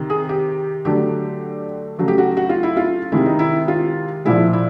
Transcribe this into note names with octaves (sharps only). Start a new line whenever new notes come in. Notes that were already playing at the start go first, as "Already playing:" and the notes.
Already playing: C3 D#3
G#4
G4
D3 F#3 A3 G4
C#3 F#3 A3
G4
F#4
F#4
F4
E4
F4
C3 D#3 G#3 E4
D#4
E4
F4
A#2 F3 G#3 E4
E4